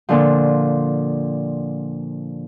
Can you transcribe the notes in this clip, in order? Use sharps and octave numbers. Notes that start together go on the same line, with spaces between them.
A#2 D3 F3